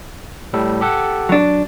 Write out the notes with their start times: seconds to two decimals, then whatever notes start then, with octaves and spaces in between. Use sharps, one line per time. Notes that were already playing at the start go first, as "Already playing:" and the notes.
0.53 A2 G3 A4
0.81 G4 A4 F#5
1.29 F#3 D4